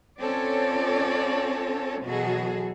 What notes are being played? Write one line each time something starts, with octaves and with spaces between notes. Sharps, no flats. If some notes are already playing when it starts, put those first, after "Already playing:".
C4 C#4 F4 A4 C#5 D5
B2 E3 F#3 F#4 G#4 A4